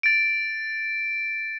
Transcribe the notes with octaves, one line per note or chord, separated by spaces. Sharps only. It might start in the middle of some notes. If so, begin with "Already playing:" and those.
A6 D7